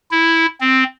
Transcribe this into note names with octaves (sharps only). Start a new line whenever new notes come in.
E4
C4